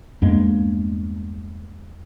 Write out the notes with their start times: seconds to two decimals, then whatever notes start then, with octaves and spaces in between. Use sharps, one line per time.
0.22 E2 G2 G#3 A#3